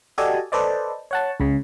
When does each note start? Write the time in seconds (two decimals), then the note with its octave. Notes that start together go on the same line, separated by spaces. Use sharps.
0.18 F#4 G4 A4 D5 D#5 G#5
0.52 A4 B4 C5 D5 D#5
1.11 C#5 F#5 A5
1.40 C#2 C#3